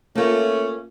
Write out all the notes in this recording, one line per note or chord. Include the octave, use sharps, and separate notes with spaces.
A3 A#3 C#4 F4